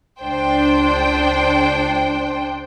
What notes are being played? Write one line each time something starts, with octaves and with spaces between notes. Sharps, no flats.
C#2 D4 C5 G5